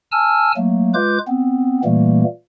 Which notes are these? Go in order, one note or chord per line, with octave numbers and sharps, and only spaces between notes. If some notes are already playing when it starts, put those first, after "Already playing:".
G#5 A5 E6 F6
F#3 A3 A#3
G#3 F4 B4 D6 G6
B3 C4
A#2 E3 G3 A3 A#3